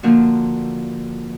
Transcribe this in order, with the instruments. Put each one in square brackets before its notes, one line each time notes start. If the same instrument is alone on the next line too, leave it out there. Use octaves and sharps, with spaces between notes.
[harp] D3 F3 A#3 D4 F#4